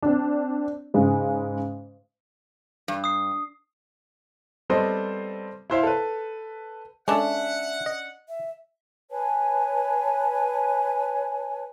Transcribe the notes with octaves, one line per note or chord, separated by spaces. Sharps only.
C4 D4
G#2 C#3 G#3
G2
D#6 C7
G3 B3 C4 A4 C5 D#5
E4 C5 E5 F5
A4 B4
G#3 C#4 D4 A4 E5 F#5
D#5
E5
B4 C#5 G#5 A5